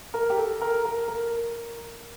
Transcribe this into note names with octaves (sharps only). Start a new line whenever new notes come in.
A#4
G4
A4
A#4
A#4
A#4